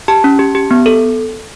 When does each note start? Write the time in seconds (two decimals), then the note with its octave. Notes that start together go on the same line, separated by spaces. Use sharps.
0.08 G4 A5
0.24 C#4
0.39 G4
0.55 G4
0.71 B3
0.86 A4